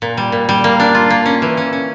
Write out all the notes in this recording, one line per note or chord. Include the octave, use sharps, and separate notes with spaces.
A#2
G3
A#2
G3
A#3
D4
F4
A#3
C#4
E3
C#4
C#4